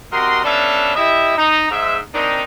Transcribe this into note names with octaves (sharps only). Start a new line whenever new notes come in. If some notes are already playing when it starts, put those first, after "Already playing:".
C3 F#4 A#4 D#5 C6
B3 C#4 D4 A4 E5 F5
E4 G4 D#5 E5
D#4
G#2 E5
D#3 C4 D4 D#4